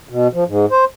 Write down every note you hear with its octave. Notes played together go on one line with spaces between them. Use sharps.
B2
F3
G#2
C5